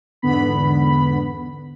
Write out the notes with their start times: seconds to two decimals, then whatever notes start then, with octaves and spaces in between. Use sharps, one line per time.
0.22 E2 G#2 D3 B3 B5